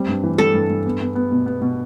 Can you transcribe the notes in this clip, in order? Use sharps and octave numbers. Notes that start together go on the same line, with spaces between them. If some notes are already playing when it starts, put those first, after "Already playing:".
Already playing: G3 C4
G2
E3
G3 A4
G2
G2
B3
B3
B3
B2
B3
B2